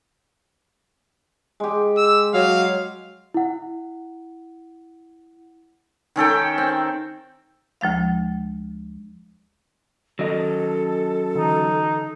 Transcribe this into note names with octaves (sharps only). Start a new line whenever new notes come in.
G#3 G4
E6
F#3 F5
E4 F#5
D#3 C#4 A4 G5
C4
D2 F3 G#3 F5
D#3 F#3 C#4 A4 D#5
D3 E3 D#4